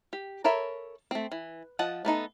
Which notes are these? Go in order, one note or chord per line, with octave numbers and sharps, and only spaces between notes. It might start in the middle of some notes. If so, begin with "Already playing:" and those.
G4
A4 A#4 C#5 E5 B5
A3 C4
E3
F3 D#5 F#5 A5
A3 B3 D#4 A4